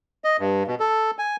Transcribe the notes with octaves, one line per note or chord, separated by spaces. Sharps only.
D#5
G2
B2
A4
G#5